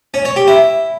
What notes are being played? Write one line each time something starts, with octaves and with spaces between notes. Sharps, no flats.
C#4
C#5
G4
E4